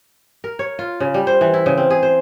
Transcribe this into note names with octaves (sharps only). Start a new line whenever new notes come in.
A#4
C#5
F4
C#3
G3
C5
E3
E4
C#3
C4
G#4
C5